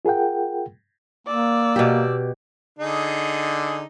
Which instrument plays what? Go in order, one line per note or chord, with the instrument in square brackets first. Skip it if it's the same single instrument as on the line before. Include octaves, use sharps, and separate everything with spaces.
[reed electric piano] F4 G#4 A#4 F#5 G5
[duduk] A#3 [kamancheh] D5 E6
[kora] B2 G4
[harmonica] D3 D#4 G#4